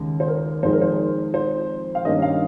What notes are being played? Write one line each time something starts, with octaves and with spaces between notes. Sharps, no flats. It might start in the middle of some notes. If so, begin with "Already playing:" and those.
Already playing: D#2 C#3 G#3 D#4
C5
A#4
F2 D#3 G#3 D#4 C5
A#4
C5
C5
F5
G2 D#3 A#3 C#4 D#5
F5